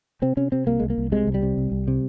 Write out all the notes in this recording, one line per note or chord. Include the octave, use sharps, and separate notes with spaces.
C3 C4
C3 C#4
C3 C4
C2 A#3
C2 G#3
A#3
C2
C3 G#3
C2
G3
C3
C2
C2
C3